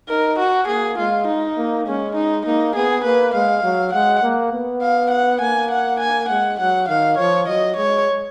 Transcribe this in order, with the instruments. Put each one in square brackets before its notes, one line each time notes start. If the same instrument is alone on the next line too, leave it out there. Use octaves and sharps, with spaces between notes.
[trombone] D#4 [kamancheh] A#4
[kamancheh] F#4
[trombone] A#3 [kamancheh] G#4
[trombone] G#3 [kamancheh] F4
[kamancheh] D#4
[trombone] A#3
[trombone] G#3 [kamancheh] C#4
[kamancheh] D#4
[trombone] A#3 [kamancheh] D#4
[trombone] B3 [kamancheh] G#4
[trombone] A#3 [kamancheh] B4
[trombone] G#3 [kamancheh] F5
[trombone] F#3
[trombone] G#3 [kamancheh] F#5
[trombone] A#3
B3
[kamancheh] F5
F#5
[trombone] A#3 [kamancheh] G#5
[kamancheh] F#5
G#5
[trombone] G#3 [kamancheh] F#5
[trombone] F#3 [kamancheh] F#5
[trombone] D#3 [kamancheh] F5
[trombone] F3 [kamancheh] C#5
[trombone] F#3 [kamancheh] D#5
[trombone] G#3 [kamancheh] C#5